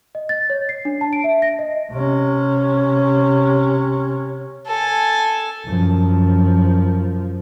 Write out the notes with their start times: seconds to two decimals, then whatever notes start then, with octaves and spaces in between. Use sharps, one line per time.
0.15 D#5
0.29 A6
0.50 C#5
0.69 C7
0.85 D4
1.01 A5
1.13 D7
1.24 E5
1.42 A#6
1.59 D#5
1.91 C3 C#4
4.67 A4 G#5
5.66 F#2 F3